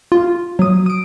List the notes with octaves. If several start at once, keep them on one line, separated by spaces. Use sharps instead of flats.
F4
F#3 D#6
D#6 D7